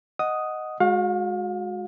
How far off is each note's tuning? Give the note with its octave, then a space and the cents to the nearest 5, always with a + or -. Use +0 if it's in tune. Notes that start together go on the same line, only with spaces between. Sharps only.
D#5 +0 F#5 +0 D#6 +0
G#3 +0 F#4 -25 F5 +30